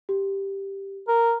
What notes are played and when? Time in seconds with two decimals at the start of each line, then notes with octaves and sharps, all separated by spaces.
0.09 G4
1.08 A#4